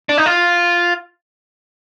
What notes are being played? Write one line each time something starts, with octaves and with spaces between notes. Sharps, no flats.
D4
D#4
F4